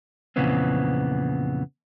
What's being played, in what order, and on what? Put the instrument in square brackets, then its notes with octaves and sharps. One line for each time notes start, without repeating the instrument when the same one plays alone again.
[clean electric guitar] F2 A#2 C#3 E3 B3 C4